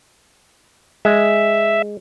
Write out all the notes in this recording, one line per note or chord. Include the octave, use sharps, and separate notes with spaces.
G#3 E5